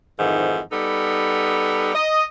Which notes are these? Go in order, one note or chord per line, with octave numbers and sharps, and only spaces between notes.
F2 G#2 D#3 E3
G3 B3 D#4 A4
D#5